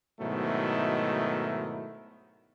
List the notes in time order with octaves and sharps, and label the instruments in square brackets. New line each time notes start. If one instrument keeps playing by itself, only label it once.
[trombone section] G#2 B2 D#3 F#3 A3 E4